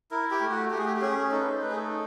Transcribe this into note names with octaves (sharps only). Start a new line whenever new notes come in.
E4 A#4
G4
A3
F#4
A3 G4
G#4
G4
G4
C#4 G#4
D#4 A4
B4
C5
A3 B4
G#4
A4